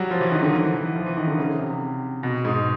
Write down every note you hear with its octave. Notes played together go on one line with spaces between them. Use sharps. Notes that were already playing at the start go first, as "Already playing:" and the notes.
Already playing: F#3 G3
F3
E3
D#3
D3
E3
E3
F3
E3
D#3
D3
C#3
C3
B2
G#2